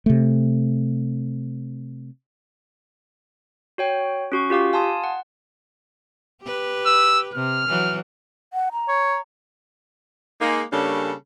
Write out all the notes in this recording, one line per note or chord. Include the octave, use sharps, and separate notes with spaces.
C3 A3
F#4 C#5 G5
C#4 F#4 C#6
F4 G4 F5 D6
F5 G#5 A5 C6 D#6
F#5
G4 B4
E6
C3 F6
E3 F#3
F#5
A#5
C#5
G#3 A#3 D#4
C#3 G3 A#3 C#4 D4 A4